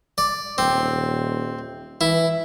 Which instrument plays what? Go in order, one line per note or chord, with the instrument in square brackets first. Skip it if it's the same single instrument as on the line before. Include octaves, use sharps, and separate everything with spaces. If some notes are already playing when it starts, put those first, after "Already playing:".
[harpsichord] D5
[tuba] D#1 [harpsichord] C4
[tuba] E3 [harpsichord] E4